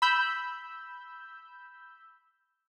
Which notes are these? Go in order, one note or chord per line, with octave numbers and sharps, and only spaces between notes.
B5 E6 G6